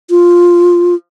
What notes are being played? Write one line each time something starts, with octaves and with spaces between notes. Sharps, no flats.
F4